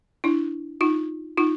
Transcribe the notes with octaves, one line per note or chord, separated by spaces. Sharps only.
D4 E4
D#4 F4
D#4 F4